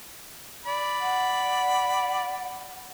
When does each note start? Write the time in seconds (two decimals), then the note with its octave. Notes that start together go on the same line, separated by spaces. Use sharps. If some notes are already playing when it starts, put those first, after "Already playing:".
0.65 D5 B5
1.01 F#5